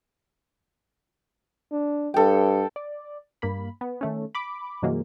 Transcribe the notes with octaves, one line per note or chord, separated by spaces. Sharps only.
D4
G2 A4 G5
D5
G2 A#3 B5
B3
D#3 A3 C#4
B5 D6
G2 C3 E3 F#3 G#3 A#3